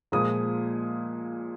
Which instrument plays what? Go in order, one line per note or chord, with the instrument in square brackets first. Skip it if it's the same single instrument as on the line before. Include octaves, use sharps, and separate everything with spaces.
[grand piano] A#2 F3 G#3 D#6